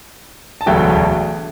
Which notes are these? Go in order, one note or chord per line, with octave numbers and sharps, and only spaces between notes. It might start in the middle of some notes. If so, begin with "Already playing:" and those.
A5
E1 D2 D3 F#3 A3 E5 G5